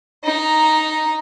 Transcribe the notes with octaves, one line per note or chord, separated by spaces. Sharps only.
D#4 A#5